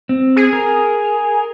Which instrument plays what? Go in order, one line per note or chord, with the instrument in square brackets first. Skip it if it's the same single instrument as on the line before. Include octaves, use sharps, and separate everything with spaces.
[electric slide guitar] C4
[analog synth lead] G#4
[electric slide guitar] A#4